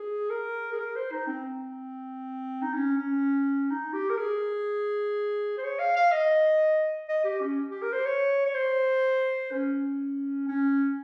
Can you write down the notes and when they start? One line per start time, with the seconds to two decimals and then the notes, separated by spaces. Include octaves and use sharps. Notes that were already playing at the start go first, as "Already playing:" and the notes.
Already playing: G#4
0.30 A#4
0.72 G#4
0.79 A#4
0.96 C5
1.12 D#4
1.27 C4
2.62 D#4
2.73 C#4
2.97 C#4
3.70 D#4
3.93 G4
4.09 A#4
4.18 G#4
5.58 C5
5.64 C#5
5.79 F5
5.96 F5
6.12 D#5
7.09 D#5
7.24 G4
7.40 C#4
7.70 G4
7.82 A#4
7.93 C5
8.05 C#5
8.46 C#5
8.54 C5
9.51 C#4
10.48 C#4